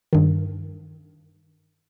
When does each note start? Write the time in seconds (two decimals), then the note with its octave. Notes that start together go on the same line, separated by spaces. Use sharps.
0.13 G2 D#3